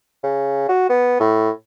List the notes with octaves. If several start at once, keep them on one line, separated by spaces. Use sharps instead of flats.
C#3
F#4
B3
A2